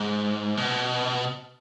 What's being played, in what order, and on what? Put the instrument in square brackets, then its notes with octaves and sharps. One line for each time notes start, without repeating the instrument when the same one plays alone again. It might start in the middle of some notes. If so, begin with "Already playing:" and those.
Already playing: [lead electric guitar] G#2
B2